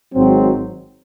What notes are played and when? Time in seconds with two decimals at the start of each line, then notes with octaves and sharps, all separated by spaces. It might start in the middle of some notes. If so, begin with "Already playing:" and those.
0.14 G#1 G#2 F#3 C4